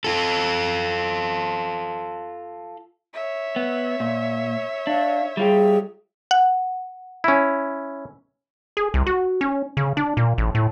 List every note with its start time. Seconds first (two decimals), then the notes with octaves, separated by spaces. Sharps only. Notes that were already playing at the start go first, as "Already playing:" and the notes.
0.04 F4 A4
3.13 C#5 E5
3.56 B3
4.00 A#2
4.87 D4 F5
5.37 G3 F4 G4 G#4
6.31 F#5
7.24 C#4 E4
8.77 G#4
8.94 C2
9.07 F#4
9.41 C#4
9.77 C#3
9.97 D4
10.17 A#2
10.38 A1
10.55 A2